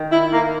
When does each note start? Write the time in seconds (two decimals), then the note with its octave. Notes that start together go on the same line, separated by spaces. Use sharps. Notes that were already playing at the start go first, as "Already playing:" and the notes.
Already playing: D#3
0.12 E4
0.33 A#3